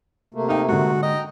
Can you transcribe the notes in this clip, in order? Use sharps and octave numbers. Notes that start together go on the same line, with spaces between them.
C3 A3 A#3
D#4 F5 G5
D3 G#3 F#4
D#5 G5 A#5